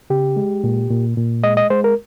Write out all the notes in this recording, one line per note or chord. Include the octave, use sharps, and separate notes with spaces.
C#3 G4
G#3
A#2
A#2
A#2
G#3 D#5
D#5
G#3 C5
A#4